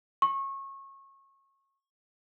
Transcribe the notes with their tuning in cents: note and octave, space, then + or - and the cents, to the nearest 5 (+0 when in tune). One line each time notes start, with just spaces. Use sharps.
C#6 -25